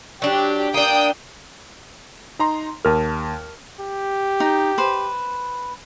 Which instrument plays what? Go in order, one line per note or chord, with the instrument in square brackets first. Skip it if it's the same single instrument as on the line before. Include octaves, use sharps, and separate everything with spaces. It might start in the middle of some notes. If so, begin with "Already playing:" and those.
[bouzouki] F#3 D4 [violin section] G4
[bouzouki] A#3 D4 [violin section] G5 D#6
[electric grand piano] D#4 A#5 C6
[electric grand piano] D#2 F6 [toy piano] A#4 A5
[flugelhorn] G4
[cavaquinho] D#4
B4 C5